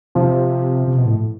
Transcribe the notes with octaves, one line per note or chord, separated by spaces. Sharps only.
C3 F3
C3
B2
A2